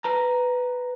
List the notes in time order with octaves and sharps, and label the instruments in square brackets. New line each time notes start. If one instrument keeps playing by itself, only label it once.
[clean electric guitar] B4 A#5